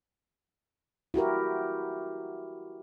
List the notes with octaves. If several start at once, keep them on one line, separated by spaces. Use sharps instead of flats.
E4 F#4 G4 A#4